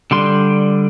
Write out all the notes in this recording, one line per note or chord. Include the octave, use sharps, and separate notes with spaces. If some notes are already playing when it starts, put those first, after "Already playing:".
D3 G3 C6